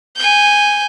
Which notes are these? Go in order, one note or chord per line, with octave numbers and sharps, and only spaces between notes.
G#5 G6